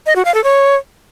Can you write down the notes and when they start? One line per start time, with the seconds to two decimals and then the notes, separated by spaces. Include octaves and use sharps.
0.06 D#5
0.16 F#4
0.25 F5
0.34 A4
0.44 C#5